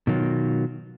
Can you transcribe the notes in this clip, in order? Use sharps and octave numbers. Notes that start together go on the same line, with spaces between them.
B2 D#3 F#3 F4